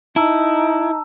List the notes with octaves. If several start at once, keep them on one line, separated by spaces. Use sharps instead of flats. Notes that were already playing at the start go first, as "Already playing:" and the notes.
D#4 E4 A5 A#5 E6